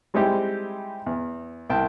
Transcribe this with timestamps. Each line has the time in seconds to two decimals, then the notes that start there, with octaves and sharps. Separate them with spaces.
0.14 G3 G#3 C4 D#4 E4 G4
1.06 E2
1.70 C2 G5 A5